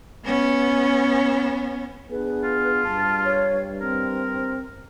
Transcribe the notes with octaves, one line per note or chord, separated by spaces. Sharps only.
B3 C#4
B3 D4 G#4 B4
F4
G2 A5
C#5
C4 A#4